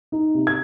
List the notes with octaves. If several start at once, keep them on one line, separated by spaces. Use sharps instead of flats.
D#4
C3
G#6